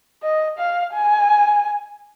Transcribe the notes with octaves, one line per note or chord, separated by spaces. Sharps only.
D#5
F5
G#5